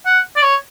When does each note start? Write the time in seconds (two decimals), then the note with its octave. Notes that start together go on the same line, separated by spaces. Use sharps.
0.06 F#5
0.36 D5
0.42 C#5